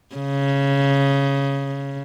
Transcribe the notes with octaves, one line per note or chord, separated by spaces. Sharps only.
C#3